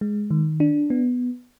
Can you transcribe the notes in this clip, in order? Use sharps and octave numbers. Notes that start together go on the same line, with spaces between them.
G#3
D#3
D4
B3